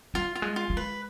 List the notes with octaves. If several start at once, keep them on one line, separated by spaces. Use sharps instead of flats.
G3 F4
F4
G#3
F4
G#3
B4